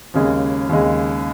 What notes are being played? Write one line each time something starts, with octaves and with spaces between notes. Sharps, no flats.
D#2 C#3 G#3
D#2 C#3 G#3